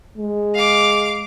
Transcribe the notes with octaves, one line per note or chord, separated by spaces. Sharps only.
G#3
F5 D6